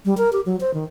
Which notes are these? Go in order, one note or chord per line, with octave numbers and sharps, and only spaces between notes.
G3
A#4
G4
F#3
C5
D#3